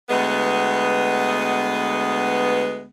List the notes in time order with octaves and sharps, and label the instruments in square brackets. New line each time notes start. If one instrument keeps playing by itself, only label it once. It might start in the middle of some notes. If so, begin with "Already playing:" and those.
[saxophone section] D2 G#3 B3